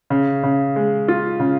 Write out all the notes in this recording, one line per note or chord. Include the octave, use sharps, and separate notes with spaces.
C#3
C#3
G#3
F4
C#3